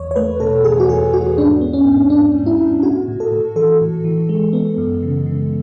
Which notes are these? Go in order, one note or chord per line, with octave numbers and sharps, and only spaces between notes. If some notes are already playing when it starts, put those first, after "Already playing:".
Already playing: E2 C#5
C#5
A3 B4
B2 A4
E2 G#4
F#4
E2 G#4
E2 F#4
G#2 D4
B3
C#4
G#2
G#2 D4
G#2
E4
G#2
A2 F#4
A2
A4
A2
E3 A4
A2
E3
G#3
B3
F#2
C#3
C#3